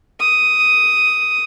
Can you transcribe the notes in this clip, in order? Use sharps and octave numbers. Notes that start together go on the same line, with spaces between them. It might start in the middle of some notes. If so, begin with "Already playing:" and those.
D#6